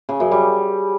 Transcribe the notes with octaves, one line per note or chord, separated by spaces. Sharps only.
C#3
F#2
G3